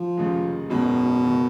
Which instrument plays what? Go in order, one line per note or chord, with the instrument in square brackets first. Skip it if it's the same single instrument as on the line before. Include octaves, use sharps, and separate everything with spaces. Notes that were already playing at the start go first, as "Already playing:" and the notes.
Already playing: [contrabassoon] F3
[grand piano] F1 D#2 C#3 G#3 D#4
[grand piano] G#1 F#2 D#3 G#3 [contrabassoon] B2
[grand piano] F#1 D#3